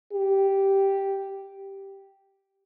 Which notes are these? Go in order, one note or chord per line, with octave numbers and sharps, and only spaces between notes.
G4